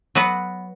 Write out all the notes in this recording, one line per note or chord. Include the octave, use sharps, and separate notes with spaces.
F#3 B3 F#4 B4